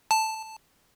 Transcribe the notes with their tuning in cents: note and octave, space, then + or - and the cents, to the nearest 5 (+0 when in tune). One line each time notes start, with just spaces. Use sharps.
A5 +0